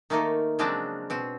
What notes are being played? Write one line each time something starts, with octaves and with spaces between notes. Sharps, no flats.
D#3 A3 A#3 D#4
C#3 F3 F#3 G#3 C4 D4
B2 C4